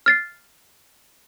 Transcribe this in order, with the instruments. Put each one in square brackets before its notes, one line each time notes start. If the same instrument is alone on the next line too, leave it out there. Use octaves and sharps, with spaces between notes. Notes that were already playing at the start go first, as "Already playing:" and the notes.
[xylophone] F6 A6 C7